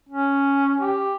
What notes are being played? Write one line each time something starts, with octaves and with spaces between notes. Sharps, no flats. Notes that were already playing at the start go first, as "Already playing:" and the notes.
C#4
G4